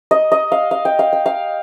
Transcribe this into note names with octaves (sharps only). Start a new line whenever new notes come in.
D#5
D#5
F5
F5
G5
F5
G5
F5